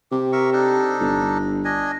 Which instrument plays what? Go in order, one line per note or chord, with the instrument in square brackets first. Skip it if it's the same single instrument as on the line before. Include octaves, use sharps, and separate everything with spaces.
[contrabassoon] C3 [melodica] G4
[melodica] A#4 E5 C#6
D4 D#4 A4
[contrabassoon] G1
[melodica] D4 D#5 G#5